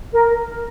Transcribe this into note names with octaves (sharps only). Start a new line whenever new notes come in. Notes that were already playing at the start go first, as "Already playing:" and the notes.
A#4